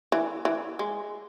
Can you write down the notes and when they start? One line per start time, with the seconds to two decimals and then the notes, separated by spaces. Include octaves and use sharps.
0.12 E3
0.45 E3
0.79 G#3